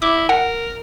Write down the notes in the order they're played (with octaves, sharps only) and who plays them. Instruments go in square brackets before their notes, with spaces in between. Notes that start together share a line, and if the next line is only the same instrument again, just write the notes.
[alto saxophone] E4 [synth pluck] D6
[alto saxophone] A#4 [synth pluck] F#5